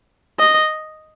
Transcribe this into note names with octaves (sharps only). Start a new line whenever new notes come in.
D#5